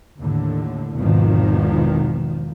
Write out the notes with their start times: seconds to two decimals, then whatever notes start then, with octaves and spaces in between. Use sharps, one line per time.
0.20 D#2 A2 D3
0.95 G#1 E2 B2 D#3 F3